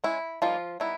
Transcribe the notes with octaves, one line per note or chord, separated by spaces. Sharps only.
G#3 C#4 E4
F3 G3 A#3 D#4 F4
G3 B3 D#4 E4